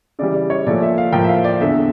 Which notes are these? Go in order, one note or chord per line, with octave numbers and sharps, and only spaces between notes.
C#3 E3 G3 D5
D5
C#5
A#2 F3 A3 D5
E5
F5
A2 F3 A#3 G5
E5
F5
D5
E2 D3 A3 E5